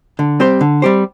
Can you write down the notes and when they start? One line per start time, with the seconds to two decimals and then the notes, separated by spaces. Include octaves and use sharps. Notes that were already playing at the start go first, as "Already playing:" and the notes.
0.19 D3
0.40 G3 C4 G4 C5
0.61 D3
0.82 G3 C4 G4 C5